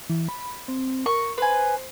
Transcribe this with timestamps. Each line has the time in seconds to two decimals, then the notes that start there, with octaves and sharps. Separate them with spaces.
0.09 E3
0.29 B5
0.68 C4
1.06 A#4 C#6
1.38 B4 C5 G#5